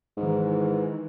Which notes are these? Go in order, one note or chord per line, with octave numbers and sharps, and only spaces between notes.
G#2 D#3 E3